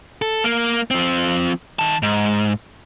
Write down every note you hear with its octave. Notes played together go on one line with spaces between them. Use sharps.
A4
A#3
F3 C4
D#3 A5
G#2